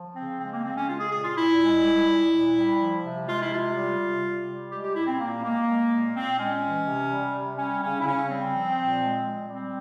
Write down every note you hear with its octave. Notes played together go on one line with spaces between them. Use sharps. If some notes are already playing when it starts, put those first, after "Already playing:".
Already playing: F3
C#3 C4
G#3 C4
A#3
C#3 C4
C#4
G#3 F4
G#4
A#2 G#4
F4
A#2 E4
G#3
G3
A#2
A#2
G3
F3
C3
G#3 F4
E4
C3 F4
G3
C3
C3
G3
G#3 G4
G4
A#2 E4
C4
A#2 A#3
G#3 A#3
G#3
A#2
A#2 C4
G#3 C#4
E3
C3
G3
C3
G3 C#4
C#3 C#4
E4
C#3 C#4
G3 C4
F3
A#2
G#3
A#2
G3 C4